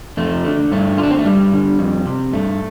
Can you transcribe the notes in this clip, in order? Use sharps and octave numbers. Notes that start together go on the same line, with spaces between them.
F2 A3
D3
G2 A3
D3 F4
D4
C4
A3
G2 G3
D3
F2
C3
G2 A3